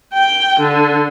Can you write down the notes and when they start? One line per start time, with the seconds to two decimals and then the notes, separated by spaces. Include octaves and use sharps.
0.13 G5
0.60 D3